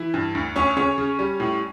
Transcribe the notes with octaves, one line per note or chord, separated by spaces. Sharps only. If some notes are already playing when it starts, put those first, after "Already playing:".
Already playing: E3 E4
G2
D2
D2 C#4 C#5
C#3 C#4 C#5
C#3
G3
A2